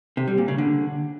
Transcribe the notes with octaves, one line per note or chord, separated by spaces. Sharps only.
C3
G3
A#2
C#3
D3